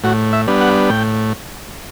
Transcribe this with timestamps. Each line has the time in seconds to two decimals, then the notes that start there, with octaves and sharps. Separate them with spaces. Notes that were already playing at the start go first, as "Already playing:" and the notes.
0.04 A2 F#4
0.33 E5
0.47 G3 B3 D4
0.61 F#5
0.90 A2 G5